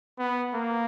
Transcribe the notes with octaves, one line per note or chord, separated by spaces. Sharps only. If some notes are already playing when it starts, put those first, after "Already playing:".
B3
A#3